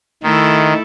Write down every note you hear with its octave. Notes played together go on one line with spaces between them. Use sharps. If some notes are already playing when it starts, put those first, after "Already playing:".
D#3 A3 E4 A4